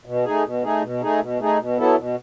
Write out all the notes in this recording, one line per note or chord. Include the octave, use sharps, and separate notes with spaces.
B2
A3 D#4 G#4
B2
A3 D#4 G#4
B2
A3 D#4 G#4
B2
A3 D#4 G#4
B2
F#3 B3 E4 A4
B2